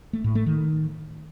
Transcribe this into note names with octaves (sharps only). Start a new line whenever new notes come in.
A3
A2
A3
D#3